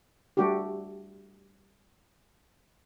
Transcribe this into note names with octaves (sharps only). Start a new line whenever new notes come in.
G3 A3 D4 F#4 G4